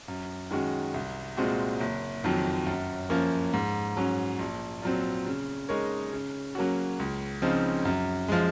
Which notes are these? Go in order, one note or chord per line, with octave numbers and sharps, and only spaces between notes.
F#2
D#3 G#3 C#4 F#4
C2
A#2 G#3 C4 F#4
F#1
F2 D#3 F#3
F#2
F3 A#3 C#4
G#2
F#3 C#4
A#1
A#2 F#3 C4
C#3
G#3 D#4 A#4 C#5
C#3
F#3 A#3 C#4 F#4
C#2
C#3 F3 C4 D#4
F#2
F3 G#3